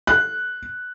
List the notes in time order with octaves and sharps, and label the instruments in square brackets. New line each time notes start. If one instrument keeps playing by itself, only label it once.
[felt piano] F#6